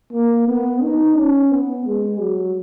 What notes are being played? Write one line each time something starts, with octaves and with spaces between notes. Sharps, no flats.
A#3
B3
D#4
C#4
B3
G#3
F#3